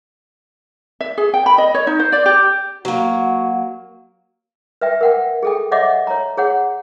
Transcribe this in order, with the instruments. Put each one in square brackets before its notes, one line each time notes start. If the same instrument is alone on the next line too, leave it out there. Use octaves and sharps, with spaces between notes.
[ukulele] E5
G#4
G5
B5
D#5
C#5
D#4
C5
D5
G4
[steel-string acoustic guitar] F#3 A#3 [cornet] F#4
[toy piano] B4 E5 G5
A#4 F#5 G5
G#4 A4 G5
C#5 D#5 E5 F#5 D6
C#5 A#5
G#4 C#5 F#5